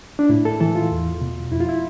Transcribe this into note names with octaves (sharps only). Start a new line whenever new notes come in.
D4
A2 E4
A4
E3 A4
F4
E2
B2
F2 E4
F4
E4